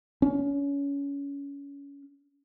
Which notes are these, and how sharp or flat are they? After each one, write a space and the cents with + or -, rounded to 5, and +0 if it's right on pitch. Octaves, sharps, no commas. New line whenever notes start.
C#4 +25